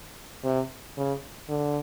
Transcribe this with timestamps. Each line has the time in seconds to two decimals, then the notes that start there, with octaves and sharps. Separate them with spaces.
0.44 C3
0.97 C#3
1.49 D3